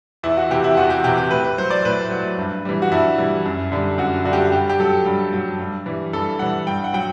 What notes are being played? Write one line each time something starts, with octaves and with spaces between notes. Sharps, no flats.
E2 E4
F#4
C3 E3 G4
E4
E2 F#4
G4
C3 E3 G4
G4
A2 B4
B4
F#3 C5
D5
A2 B4
F#3
G2
E3 G3
F#4
G2 E4
E3 G3
F#2
D3 G3
F#2 F#4
D3 G3 F#4
G4
F#4
G2 G4
G4
F#3 A4
G2
F#3
G2
E3 G3
G2 A4
E3 G3 F#5
G2 G5
F#5
F#3 G5